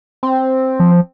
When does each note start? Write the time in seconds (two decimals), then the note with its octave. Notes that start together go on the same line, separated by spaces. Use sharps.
0.23 C4
0.80 F3